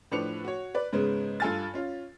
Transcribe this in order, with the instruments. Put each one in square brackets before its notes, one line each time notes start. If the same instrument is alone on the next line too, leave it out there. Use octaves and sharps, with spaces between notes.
[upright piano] A2 F3 D4 B4 C#7 F7
F#4 C#5
B4 D5
G#2 C#3 G#3 B3
G2 F4 A4 G#5 F6 A6
C#4 F4